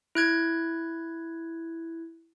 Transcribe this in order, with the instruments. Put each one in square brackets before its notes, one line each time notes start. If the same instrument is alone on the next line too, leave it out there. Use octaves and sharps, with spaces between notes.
[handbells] E4 F#6 G#6